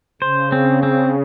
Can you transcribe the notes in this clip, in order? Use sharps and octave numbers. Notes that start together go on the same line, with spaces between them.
C#3 C5
C4
C4